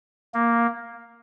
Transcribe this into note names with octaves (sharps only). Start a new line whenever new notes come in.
A#3